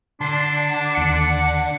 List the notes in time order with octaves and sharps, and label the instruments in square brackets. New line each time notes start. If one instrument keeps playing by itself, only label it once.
[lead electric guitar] D3 [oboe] D4 [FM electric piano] A5 [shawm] C6
[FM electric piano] D#2 C#7 [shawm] F#5